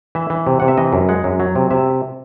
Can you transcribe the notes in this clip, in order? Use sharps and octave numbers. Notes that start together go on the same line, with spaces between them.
E3 E5
E3
C3
C3 F#5
E5
E3 D#5
F#2
G#3 F#5
F#2
F#3
C3
C3 E5